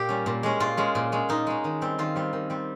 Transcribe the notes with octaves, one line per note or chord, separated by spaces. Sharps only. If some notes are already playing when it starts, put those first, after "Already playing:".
Already playing: A#2 G4
G3 C#4
A#2
G#3 C#4
A#2 F4
G#3 C#4
A#2
G#3 C#4
A#2 D#4
G#3 C#4
D#3
G3 C4
D#3 F4
G3 C4
D#3
G3 C4